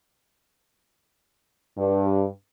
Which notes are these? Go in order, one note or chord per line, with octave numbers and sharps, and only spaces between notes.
G2